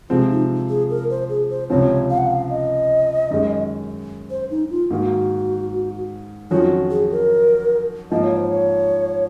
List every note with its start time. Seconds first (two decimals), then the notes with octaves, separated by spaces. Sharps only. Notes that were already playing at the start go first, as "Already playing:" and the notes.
0.10 C3 F3 G#3 C4 F4
0.30 D#4
0.69 G#4
0.90 A#4
1.10 C5
1.29 G#4
1.50 C5
1.70 C#2 C3 F3 C4 C#5
2.10 F5
2.18 F#5
2.26 F5
2.50 D#5
3.31 F#2 D#3 G#3
4.30 C5
4.51 D#4
4.70 F4
4.91 G#2 D#3 A#3 F#4
6.51 F2 D#3 F#3 C#4 F4 F#4
6.91 G#4
7.11 A#4
8.11 G#2 F3 A#3 D#5
8.23 C#5
8.37 C5
8.49 C#5